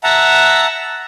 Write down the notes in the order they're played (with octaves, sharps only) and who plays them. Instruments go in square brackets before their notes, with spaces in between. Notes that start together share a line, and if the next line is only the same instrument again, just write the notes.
[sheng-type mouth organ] E5 F#5 A5 A#5